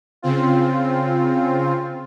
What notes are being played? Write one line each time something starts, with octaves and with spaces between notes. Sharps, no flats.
C#3 C4 F4